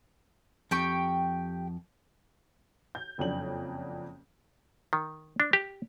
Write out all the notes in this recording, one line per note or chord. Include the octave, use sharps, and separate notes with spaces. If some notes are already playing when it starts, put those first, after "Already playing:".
F2 G4 G5 C#6
G6
F#1 F2 F#3 C#4 D4 F#7
D#3
D4
G4